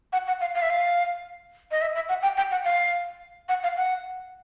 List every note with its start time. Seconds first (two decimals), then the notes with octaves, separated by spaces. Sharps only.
0.13 F#5
0.27 F#5
0.41 F5
0.55 F5
0.62 E5
0.70 F5
1.71 D#5
1.81 E5
1.95 E5
2.09 F#5
2.23 G5
2.37 G5
2.51 F#5
2.65 F5
3.49 F#5
3.63 F5
3.77 F#5